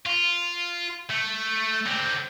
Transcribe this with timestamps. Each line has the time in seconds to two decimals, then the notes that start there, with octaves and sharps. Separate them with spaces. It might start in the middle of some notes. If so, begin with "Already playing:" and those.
0.06 F4
1.10 A3
1.86 D3 C4